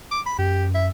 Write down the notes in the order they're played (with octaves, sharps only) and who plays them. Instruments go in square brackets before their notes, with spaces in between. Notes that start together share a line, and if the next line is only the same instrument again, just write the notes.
[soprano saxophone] D6
B5
[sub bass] F#2 [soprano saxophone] G4
[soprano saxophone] E5